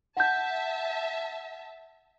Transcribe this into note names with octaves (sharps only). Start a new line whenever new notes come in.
E5 F#5 A5 G6